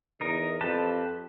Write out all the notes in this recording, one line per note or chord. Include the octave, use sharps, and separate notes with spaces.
E2 D#4 A#4
F2 G4 B4 A5